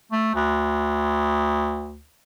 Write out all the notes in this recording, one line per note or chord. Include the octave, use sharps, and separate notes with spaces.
A3
D2